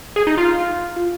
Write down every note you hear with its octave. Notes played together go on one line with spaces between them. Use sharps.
G#4
D#4
F4